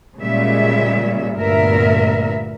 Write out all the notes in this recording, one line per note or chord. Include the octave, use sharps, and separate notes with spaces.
A#2 C#3 G3 G#3 E5
D2 G2 A#2 B3 A#4 E5